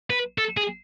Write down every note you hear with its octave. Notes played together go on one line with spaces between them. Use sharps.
B4
A4
G#4